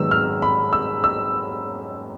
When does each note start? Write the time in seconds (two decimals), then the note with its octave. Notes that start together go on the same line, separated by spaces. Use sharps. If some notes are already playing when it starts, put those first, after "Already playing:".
Already playing: G#2 D#3 F#3 B3 E6
0.11 F6
0.42 B5
0.73 E6
1.04 E6